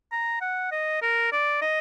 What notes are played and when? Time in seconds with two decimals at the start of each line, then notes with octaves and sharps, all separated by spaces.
0.12 A#5
0.41 F#5
0.72 D#5
1.02 A#4
1.32 D5
1.62 D#5